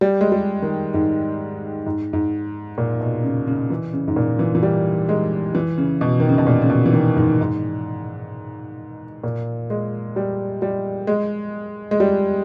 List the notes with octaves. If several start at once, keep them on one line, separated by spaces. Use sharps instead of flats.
G3
G#3
G3
D#3
G#2
G#2
G#2
A#2
B2
C#3
C#3
E3
C#3
G#2
A#2
E3
E3
G3
G#3
E3
C#3
B2
D#3
C#3
B2
A#2
C#3
B2
E3
D#3
G#2
G#2
A#2
G#3
G3
G3
G#3
G#3
G3